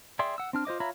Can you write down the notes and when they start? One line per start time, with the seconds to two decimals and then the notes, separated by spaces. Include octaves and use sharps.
0.19 G#4 D5 E5 G5 C6
0.38 F#5 E6
0.53 C4 D4 F6
0.65 F4 C5 D#5 D6
0.80 F4 C#5 E5 A#5 B5